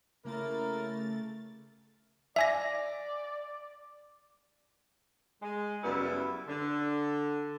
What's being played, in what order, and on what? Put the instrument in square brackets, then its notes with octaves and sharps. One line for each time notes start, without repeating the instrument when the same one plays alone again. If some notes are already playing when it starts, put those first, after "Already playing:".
[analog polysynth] C#3 A3 A6 [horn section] A#3 E4 A#4
[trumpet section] D5 [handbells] E5 G#5 A#6
[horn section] G#3
F#2 C#3 G3 B3 E4
D3